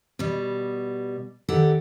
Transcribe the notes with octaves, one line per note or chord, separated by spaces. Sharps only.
B2 G3
D#2 G4 A4 F#5